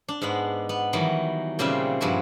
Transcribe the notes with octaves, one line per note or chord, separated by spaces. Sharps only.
D4
G#2 G#3 B3
B3
D#3 E3 F#3 G3 D#4
A#2 C#3 G3 C4 F4 E5
G2 F3 E4 F#4 G#5